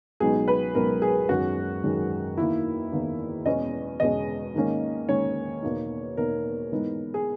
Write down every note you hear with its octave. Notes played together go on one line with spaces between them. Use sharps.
C#2 B2 F#3 B3 D#4 G#4
B4
C#2 B2 F#3 B3 D#4 A#4
G#4
F#2 D#3 G#3 F#4
F#2 D#3 G#3
E2 D#3 A#3 E4
E2 D#3 A#3
E2 B2 G#3 C#4 D#5
E2 B2 G#3 C#4 D#5
G#2 D#3 A#3 C#4
G#2 D#3 A#3 C#4 C#5
E2 B2 A#3 D#4
E2 B2 A#3 D#4 A#4
G#2 E3 B3 D#4
G#4